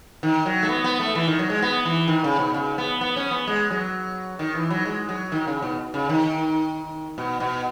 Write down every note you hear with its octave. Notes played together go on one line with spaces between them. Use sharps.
D#3
F#3
A3
B3
B3
A3
E3
D#3
F#3
G#3
B3
E3
D#3
C#3
B2
C#3
B3
B3
C#4
B3
G#3
F#3
D#3
E3
F#3
G#3
F#3
D#3
C#3
B2
C#3
D#3
B2
B2